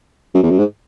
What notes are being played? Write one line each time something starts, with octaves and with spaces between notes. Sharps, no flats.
F#2
E2
F#2
G#2